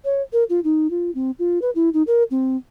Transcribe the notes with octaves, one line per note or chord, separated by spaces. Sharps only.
C#5
A#4
F4
D#4
F4
C4
F4
B4
E4
D#4
A#4
C4